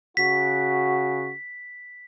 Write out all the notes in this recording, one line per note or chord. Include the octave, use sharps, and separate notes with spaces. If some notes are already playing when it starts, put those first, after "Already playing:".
C#3 F#4 B6